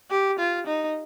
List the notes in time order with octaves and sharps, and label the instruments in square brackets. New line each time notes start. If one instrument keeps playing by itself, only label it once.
[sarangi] G4
F4
D#4